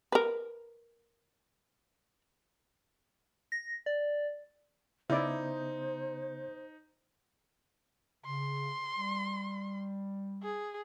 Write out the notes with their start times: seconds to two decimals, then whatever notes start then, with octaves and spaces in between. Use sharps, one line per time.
0.12 A#4 B4
3.52 A#6
3.86 D5
5.10 C#3 B3 D#4 E4 C5 D5
8.25 C#3 C6
8.97 G3
10.43 G#4